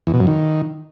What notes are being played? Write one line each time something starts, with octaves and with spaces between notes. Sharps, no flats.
E2
B2
F#2
D#3